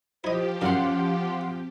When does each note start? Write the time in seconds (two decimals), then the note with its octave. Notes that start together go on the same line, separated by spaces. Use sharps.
0.24 F3 E4 G4 C5 D#5
0.62 F#2 C#3 C#4 F5 F#5 C6
1.22 C4